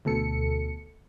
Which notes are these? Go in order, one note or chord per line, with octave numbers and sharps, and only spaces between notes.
D2 B2 A4 C#7